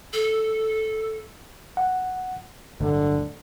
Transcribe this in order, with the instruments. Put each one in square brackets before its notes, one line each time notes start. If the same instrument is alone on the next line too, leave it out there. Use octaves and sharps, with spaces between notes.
[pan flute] A4
[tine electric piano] F#5
[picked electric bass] D1 G1 D2 [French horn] D3